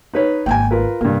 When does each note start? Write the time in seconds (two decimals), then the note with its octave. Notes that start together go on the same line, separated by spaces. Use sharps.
0.14 D#4 B4 C#5
0.46 G#1 A#3 G5 G#5
0.71 F4 A#4 B4
1.01 G2 C3 A#3